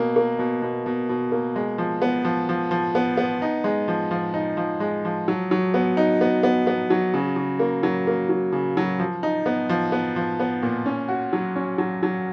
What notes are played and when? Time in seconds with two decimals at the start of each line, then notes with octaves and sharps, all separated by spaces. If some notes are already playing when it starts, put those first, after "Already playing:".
Already playing: B2 A#3
0.16 A#3
0.39 B2
0.62 B2
0.86 B2
1.09 B2
1.32 A#3
1.56 G#3
1.78 F3
2.02 B3
2.25 F3
2.49 F3
2.71 F3
2.95 B3
3.17 B3
3.42 D#4
3.64 G#3
3.88 F3
4.11 F3
4.34 D#4
4.57 F3
4.80 G#3
5.05 F3
5.28 F#3
5.51 F#3
5.74 B3
5.97 D#4
6.21 B3
6.43 B3
6.67 B3
6.90 F#3
7.14 C#3
7.36 C#3
7.59 A#3
7.83 F#3
8.07 A#3
8.29 F#3
8.53 C#3
8.77 F#3
8.99 F3
9.23 D#4
9.46 B3
9.69 F3
9.92 B3
10.16 F3
10.40 B3
10.63 A#2
10.86 C#4
11.08 F#4
11.33 F#3
11.56 C#4
11.78 F#3
12.03 F#3